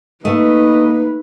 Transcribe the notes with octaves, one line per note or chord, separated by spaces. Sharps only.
A3 A#3 D#4 B4 D#5